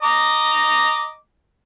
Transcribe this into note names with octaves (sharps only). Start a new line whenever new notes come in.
D#5 A#5 D6